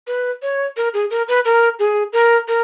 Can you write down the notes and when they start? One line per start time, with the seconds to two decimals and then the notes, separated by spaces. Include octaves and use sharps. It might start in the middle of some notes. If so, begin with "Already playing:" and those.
0.07 B4
0.42 C#5
0.77 A#4
0.94 G#4
1.10 A#4
1.28 B4
1.45 A#4
1.79 G#4
2.13 A#4
2.48 A#4